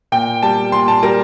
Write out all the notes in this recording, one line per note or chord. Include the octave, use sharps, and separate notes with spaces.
A#2 G5
G3 A5
A#2 C6
A5
G3 A#4